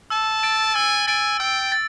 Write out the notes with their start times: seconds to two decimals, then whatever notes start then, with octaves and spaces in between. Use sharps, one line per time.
0.10 A5 E6
0.43 A6 D7
0.75 G#5 E6
1.07 G#5 A6 D7
1.39 G5 E6
1.72 A6